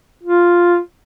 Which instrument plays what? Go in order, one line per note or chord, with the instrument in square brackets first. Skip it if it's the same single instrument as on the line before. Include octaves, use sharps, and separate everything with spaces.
[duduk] F4